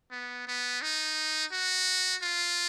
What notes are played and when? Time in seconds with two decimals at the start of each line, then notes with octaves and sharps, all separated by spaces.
0.11 B3
0.47 B3
0.82 D#4
1.52 F#4
2.22 F4